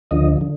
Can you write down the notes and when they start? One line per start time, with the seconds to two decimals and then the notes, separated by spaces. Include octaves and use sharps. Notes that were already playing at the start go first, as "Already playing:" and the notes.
0.11 D2 D3 F3 D#5
0.41 D3